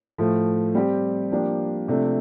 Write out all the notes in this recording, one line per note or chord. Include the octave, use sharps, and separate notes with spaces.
A2 F3 A3
G3 C4 G4
F3 A#3 D4 G4
C3 F3 A3 D4